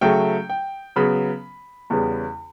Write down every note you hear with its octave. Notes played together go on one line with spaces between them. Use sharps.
C#3 F#3 A3 G5
G5
C#3 F#3 B3 B5
E2 C#3 G3 B3